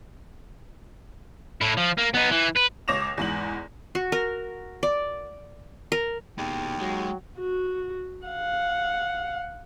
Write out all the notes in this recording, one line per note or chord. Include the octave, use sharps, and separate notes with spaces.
A2 E4
F3
A#3
B3 D#4
E3
B4
C#2 C#5 D6 A#6 E7 F7
E2 G#2 F#7
F#4
A#4
D5
A#4
D#2 B2 G#3 G5
F#3 G#3
F#4
F5 F#5